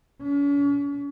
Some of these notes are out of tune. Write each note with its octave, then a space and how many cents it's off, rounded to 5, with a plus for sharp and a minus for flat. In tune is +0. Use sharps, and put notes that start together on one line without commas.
C#4 +40